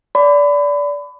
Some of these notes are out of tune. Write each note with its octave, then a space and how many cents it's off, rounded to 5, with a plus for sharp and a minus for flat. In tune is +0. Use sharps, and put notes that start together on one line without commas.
D5 -20 B5 +30